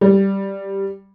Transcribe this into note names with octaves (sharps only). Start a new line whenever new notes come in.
G3